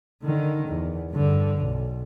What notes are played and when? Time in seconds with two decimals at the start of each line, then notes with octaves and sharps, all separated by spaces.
0.23 D3 D#3
0.68 E2
1.11 G2 D3
1.58 B1